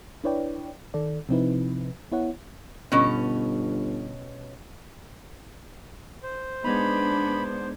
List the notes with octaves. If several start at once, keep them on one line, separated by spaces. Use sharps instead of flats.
D4 E4 B4 C#5 D5 G5
D#3 A4 D5
C3 F3 C4 D#4 E4 B4
B3 E4 C#5 F#5
G1 B2 C#4
C5
G#3 B3 D4 D#4 B5